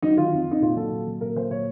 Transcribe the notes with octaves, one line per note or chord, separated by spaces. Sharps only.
F#3 D#4
D#3 F4
F2
F2 D#4
A#2 F4
F#3 A4
A#2
F#3
A#2 A#4
F#3 C5
A#2 C#5